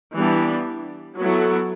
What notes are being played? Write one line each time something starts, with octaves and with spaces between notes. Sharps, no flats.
E3 G3 B3 D4 G4
F#3 B3 E4 A4